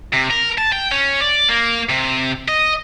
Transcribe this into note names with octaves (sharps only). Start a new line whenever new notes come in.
C3
A#4
A5
G5
C#4
D5
A#3
C3
D#5